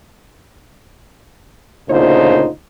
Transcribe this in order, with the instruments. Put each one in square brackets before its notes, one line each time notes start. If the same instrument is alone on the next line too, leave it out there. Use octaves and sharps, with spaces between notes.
[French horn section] D2 A#2 C#3 D#4 F4 C5